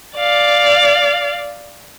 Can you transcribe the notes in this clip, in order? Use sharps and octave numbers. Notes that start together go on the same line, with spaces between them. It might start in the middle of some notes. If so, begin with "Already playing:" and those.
D5 F5